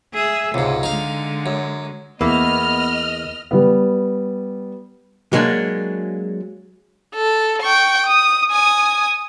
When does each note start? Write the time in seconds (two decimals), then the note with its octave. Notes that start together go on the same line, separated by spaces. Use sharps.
0.14 G#4 E5
0.54 C#2 G#2 C3
0.83 D3 G#3 D#4 F5
1.46 F#2
2.21 E2 A#3 B3 D#5 E5 F6
3.51 G3 B3
5.33 F#3 G#3 A#3 D4
7.15 A4
7.62 G5 C#6
8.06 D#6
8.51 G#5 D#6